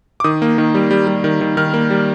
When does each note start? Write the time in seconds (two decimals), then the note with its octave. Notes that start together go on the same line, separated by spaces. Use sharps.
0.20 D6
0.24 D#3 D#6
0.42 A#3
0.58 D#3
0.74 G3
0.91 G3
1.08 G3
1.24 D#3
1.41 D#3
1.57 D#3 F6
1.74 A#3
1.90 G3